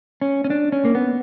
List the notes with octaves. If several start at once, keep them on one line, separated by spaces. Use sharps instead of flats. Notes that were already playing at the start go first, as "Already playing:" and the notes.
C#4
C#4
D4
C#4
A#3
B3